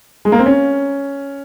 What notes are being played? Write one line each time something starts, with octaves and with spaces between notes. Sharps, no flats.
G#3
A#3
C4
C#4